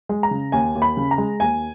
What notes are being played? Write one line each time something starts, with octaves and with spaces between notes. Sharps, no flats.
G#3
A#5
C#3
D#2 G#5
D#2
B5
C#3
A#5
G#3
D#2 G#5